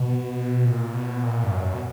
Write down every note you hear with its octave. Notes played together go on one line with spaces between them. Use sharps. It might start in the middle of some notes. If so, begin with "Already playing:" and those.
Already playing: B2
A#2
B2
A#2
G2
F#2
B2